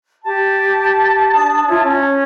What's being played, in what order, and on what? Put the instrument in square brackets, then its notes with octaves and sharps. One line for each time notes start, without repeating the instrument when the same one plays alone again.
[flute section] G4 [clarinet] A5
[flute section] D4 D#6
E4 F4 C#5
C#4